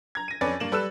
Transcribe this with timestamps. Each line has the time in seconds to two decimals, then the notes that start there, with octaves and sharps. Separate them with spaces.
0.15 A#5 G#6
0.28 A#6 D#7
0.41 F2 C#4 B4 D5 G#5 A6
0.60 G2 A#3 E7 F#7
0.72 G3 A4 B4 E6 F#6 E7